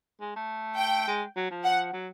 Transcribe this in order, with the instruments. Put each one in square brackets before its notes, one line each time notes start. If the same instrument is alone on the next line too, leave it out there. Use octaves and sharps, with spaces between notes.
[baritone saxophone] G#3
A3
[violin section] G5
[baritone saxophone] G#3
F#3
F3
[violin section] F#5
[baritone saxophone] F#3